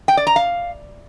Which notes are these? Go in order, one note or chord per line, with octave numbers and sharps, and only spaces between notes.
G5
D5
A#5
F5